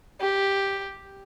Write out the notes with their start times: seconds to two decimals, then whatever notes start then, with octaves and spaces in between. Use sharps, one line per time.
0.20 G4